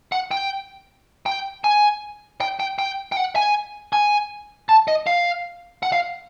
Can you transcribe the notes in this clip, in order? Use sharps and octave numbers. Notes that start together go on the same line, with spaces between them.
F#5
G5
G5
G#5
G5
G5
G5
G5
F#5
G#5
G#5
A5
D#5
F5
F#5
F5